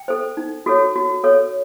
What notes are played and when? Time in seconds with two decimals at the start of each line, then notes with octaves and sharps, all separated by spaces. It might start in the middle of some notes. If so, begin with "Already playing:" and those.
Already playing: G5
0.08 A4 C5
0.37 D#4
0.66 F#4 A4 C#5
0.96 F#4
1.24 A4 C#5